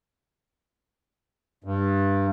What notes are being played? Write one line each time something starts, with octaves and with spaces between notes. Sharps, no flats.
G2